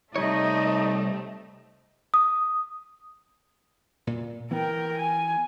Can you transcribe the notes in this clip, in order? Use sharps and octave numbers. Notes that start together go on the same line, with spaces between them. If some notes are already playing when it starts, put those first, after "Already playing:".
C2 G3 A3 C4 D#4 C#5 D#5
D#6
A#2
E3 B3 A#4 G5
G#5